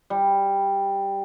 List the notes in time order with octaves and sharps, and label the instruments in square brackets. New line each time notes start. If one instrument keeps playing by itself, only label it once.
[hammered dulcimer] G3